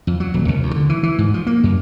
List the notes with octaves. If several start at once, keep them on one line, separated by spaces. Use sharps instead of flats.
F2
F#3
D#1
C2
D2
D3
E3
E3
G#2
F3
A#3
F#2